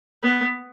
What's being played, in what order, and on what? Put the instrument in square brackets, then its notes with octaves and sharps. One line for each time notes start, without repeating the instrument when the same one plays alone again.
[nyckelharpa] B3